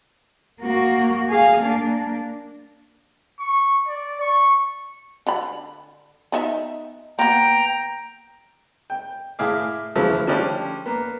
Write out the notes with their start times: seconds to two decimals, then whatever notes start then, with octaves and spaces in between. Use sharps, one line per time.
0.61 A#3 F#4
1.30 G#4 F5
1.60 A#3 D4
3.40 C#6
3.88 D5
4.21 C#6
5.27 D3 B5
6.32 B3 D#4 E5
7.19 A#3 B3 G5 A#5
8.90 G5
9.39 A2 E4 G#4 F5 D6
9.95 C#3 E3 F3 G#3 A3 B3
10.27 D3 F3 G3 C#4 D5
10.86 A#3 B3